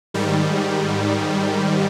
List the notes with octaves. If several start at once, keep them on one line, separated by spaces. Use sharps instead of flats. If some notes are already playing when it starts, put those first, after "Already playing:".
G#2 D#3 G3